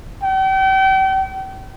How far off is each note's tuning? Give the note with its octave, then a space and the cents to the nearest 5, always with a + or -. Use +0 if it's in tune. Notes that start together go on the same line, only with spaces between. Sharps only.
G5 -40